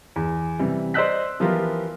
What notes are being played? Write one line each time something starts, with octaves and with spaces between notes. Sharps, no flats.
E2
C3 E3 G3
C5 D5 D#5 E6 F#6 B6
E3 F3 B3 F4 G4 A#4